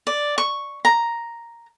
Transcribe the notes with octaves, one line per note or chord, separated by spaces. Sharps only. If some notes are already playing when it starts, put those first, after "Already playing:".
D5
C#6
A#5